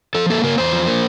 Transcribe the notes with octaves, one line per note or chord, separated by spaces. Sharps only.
F3 A4
A#3 A4
C#3 A#4
E2 C5
F3
A#3